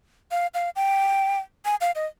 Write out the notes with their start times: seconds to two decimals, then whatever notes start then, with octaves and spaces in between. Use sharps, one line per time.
0.31 F5
0.54 F5
0.76 G5
1.65 G#5
1.81 F5
1.95 D#5